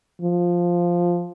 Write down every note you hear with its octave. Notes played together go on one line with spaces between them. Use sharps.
F3